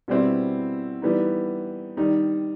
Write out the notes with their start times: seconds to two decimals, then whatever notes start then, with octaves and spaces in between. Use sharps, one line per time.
0.08 B2 G3 C4 E4
1.02 E3 G3 B3 D#4
1.97 D#3 G3 D#4